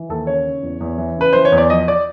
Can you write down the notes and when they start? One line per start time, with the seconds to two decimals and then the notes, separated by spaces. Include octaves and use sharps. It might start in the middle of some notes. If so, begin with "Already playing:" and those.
Already playing: E3
0.09 D#2 A4
0.27 C#3 C#5
0.45 C#3
0.63 E2
0.81 E2
0.98 E3
1.17 C#3 B4
1.33 E3 C5
1.45 C#5
1.52 E2
1.58 D5
1.70 F3 D#5
1.88 D5